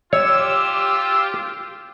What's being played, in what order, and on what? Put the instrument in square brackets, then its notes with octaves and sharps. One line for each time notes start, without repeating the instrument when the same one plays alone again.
[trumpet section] F4 G4 [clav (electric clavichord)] C#5 [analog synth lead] E6